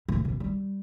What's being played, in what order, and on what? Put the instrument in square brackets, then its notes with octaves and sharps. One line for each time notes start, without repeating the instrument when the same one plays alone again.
[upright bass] A2
B2
G3